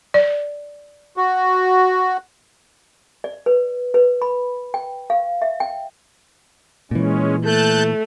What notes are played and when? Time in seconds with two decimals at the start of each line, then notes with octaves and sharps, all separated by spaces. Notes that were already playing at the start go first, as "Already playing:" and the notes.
0.14 D5
1.17 F#4
3.24 D5
3.46 B4
3.94 B4
4.22 B5
4.74 G5
5.10 F5
5.42 E5
5.60 G5
6.91 A#2 E3 G#3 C#4
7.44 A3 A5 F#6 G6